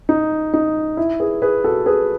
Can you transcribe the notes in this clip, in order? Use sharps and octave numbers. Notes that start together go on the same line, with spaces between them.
D#4
D#4
E4
G#4 B4
G#4 B4
F#4 A4
G#4 B4